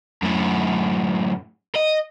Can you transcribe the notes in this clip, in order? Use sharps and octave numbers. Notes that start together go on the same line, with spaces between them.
F#2 A2
D#5